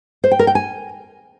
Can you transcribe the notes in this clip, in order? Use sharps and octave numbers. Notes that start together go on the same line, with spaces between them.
C5
G5
A#4
G5
G#5